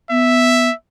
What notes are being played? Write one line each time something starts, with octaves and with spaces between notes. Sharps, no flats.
B3 E5